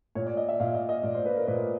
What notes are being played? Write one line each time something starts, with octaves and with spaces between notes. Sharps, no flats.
A#2 C#5
D5
D#5
E5
A#2 F5
D#5
D#5
A#2 D5
C5
B4
A#4
A#2 B4